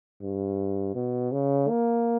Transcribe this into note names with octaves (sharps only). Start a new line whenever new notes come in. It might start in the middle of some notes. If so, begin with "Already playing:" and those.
G2
B2
C#3
A#3